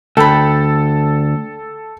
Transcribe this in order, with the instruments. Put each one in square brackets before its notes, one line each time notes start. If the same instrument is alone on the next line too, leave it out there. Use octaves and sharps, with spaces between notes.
[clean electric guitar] D2 [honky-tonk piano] A4 [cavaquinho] G5 B5